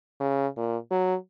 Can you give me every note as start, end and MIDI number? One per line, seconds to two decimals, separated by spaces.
0.20 0.47 49
0.57 0.77 46
0.91 1.15 54